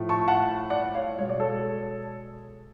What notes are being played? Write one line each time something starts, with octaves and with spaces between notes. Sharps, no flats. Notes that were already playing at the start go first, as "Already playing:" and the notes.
Already playing: A2 F3 A3
A5 C#6
F#5 A5
D5 F#5
C#5 F5
B2 G#3 C#5
D5
A4 C#5